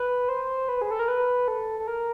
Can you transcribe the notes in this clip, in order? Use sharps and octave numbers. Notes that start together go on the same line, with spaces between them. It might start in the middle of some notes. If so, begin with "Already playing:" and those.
Already playing: B4
C5
B4
G#4
A4
A#4
B4
A4
A4
A#4